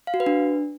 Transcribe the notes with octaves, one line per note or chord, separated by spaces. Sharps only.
F5
F#4
B4
D4